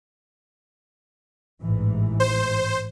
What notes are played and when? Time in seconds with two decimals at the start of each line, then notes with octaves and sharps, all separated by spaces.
1.62 A1 G#2 E3
2.20 C5